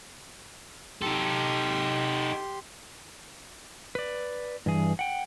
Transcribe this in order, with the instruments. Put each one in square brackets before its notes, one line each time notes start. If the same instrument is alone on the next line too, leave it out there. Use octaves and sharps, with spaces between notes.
[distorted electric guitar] D#4 A4 [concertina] G4 C6
[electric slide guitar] B4 D5
G2 E3 G#4
F#5 G5